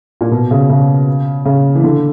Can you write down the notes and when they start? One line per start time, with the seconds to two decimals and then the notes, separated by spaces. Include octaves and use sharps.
0.21 A#2
0.31 B2
0.51 C#3
0.70 C#3
1.45 C#3
1.75 E3
1.84 D3